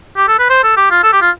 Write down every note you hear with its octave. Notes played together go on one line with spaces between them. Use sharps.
G4
A4
B4
C5
A4
G4
F4
A4
G4
F4